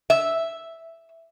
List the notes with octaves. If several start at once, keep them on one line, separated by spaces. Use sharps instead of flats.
E5